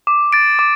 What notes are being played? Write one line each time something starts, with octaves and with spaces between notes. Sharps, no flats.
D6
A6 D7
D6